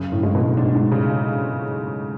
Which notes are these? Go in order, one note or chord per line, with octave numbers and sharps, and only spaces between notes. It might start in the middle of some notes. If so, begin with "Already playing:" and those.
Already playing: F#2 C#3
A2
A2 G#3
B2
G#2 D4
G#2
C#3